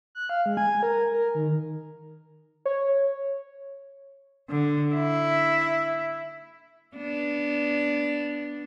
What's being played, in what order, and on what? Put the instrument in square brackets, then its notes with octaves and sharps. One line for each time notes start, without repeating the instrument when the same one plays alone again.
[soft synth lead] F#6
F5
G#3
G#5
A#4
A#4
D#3
[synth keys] C#5
[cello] D3
E4
[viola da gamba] B3 D4